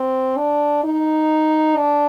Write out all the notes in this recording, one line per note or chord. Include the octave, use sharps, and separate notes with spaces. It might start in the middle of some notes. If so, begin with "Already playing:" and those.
Already playing: C4
D4
D#4
D4